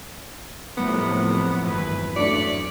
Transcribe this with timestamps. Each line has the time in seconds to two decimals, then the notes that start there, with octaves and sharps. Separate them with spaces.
0.77 F2 A2 C3 F#3 G3 A#3 B3
1.64 G#1 E2 G2 B4
2.16 F#3 A3 D4 D5 B6 C#7